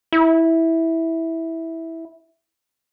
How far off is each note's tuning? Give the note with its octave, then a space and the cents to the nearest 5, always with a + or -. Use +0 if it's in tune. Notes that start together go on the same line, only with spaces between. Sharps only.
E4 -10